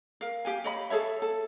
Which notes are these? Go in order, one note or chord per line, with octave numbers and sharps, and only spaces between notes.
A#4 F5
G4 F5 G#5
C#5 D#5 B5
G#4 A4 C#5 E5
A4